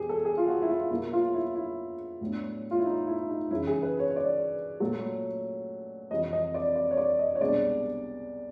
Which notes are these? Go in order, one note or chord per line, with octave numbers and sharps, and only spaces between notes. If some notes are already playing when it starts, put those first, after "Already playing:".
Already playing: E2 B2 G4 G#4
A4
G#4
F4
F#4
E4
F4
B2 F#3 A#3 E4
F4
E4
E4
A2 F#3 B3 D4
F4
E4
D#4
E4
D#4
F#2 C#3 E3 E4
G#4
B4
C#5
C#5
D5
A#2 F#3 A3
F2 C3 E3 D#5
D#5
D5
D5
C#5
D5
D#5
C#5
C2 B2 G#3 B3 D4 D5